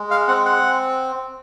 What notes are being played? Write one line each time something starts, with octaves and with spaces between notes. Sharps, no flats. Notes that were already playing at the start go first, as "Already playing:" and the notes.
Already playing: G#3
F5
C4 F#5
F#5